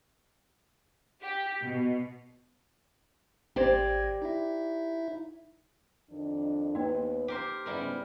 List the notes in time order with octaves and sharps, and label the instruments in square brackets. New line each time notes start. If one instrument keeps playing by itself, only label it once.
[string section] G4
B2
[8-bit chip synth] G#1 G#6 A#6 [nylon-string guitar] G4 C5 D5
[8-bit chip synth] D#4 E4 E5
[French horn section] F2 D#3 D4
[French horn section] D#2 B3 B4 [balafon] A#3 D#4
[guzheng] G4 A#4 C5
[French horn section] G#2 C#3 B3 [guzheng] G3 E4 A#4